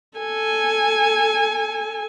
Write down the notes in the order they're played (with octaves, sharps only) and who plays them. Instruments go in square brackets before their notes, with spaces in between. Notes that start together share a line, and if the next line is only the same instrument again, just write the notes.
[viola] A4 G#5